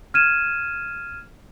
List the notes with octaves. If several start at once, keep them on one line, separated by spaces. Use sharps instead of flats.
F6 G#6 D#7 E7